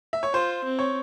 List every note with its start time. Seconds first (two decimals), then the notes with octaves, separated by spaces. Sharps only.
0.13 E5
0.23 C#5
0.33 F4 C5
0.64 C4
0.79 C#5